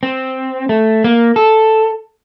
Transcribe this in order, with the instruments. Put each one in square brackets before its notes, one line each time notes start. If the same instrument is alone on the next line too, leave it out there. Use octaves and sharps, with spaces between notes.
[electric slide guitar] C4
A3
A#3
A4